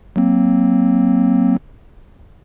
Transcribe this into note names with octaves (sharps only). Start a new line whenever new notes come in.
F#3 A#3 C4